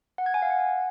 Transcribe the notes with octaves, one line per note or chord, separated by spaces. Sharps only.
F#5
G#6
G#5
F5
F#5